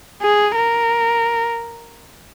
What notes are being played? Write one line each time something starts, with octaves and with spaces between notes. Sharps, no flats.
G#4
A#4